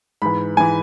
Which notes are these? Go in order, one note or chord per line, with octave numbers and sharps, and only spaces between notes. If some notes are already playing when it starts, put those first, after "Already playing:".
G#2 E3 B5
G#2 E3 G#5